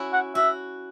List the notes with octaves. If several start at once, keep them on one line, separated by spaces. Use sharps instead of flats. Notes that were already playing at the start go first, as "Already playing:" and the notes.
Already playing: C#4 E4 F#4
F#5
F#4 E5